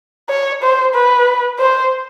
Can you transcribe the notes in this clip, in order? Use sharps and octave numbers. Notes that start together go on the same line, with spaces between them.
C#5
C5
B4
C5